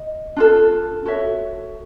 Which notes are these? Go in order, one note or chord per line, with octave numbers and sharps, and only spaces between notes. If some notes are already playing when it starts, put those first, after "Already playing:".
Already playing: D#5
D4 F4 A4
F#4 A4 C#5 E5